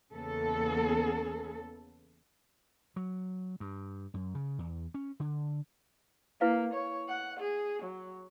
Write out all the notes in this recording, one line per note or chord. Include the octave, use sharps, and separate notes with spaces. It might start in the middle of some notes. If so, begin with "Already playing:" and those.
E2 C#3 A#3 B3 A4
F#3
G2
F#2
C#3
E2
C#4
D3
A#3 E4 B4 F5
C#5
F#5
G#4
F#3